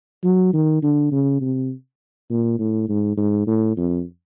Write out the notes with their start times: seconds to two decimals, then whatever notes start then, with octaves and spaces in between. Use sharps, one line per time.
0.23 F#3
0.53 D#3
0.83 D3
1.12 C#3
1.41 C3
2.30 A#2
2.59 A2
2.89 G#2
3.17 G#2
3.47 A2
3.77 F2